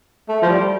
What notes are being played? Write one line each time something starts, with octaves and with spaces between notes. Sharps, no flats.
A3
F3
G3